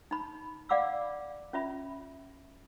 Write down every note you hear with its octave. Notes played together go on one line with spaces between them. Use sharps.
D#4 B5
D5 F5 F#5 B5 D6 E6
C#4 F4 E5 B5